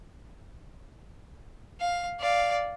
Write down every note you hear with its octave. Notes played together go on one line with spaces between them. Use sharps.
F5
D5 F5